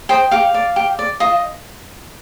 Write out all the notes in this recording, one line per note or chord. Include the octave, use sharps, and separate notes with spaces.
C5 D#5 G5
G4 F5
D5
G4
D5
F4 D#5